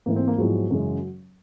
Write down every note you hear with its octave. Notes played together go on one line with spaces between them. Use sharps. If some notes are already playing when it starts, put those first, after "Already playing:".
G#2 E3 A3 A#3
C4
A#3
G#2 F3 F#3 G#3 B3 E4
F#2 C#3 E3 G#3